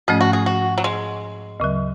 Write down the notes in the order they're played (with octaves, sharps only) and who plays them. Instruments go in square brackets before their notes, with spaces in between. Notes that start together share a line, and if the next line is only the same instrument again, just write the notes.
[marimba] G#2 F3 A3 C#4 [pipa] G#4
[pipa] F#4
G#4
F#4
F#3
G#3
[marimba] D2 C#3 F#3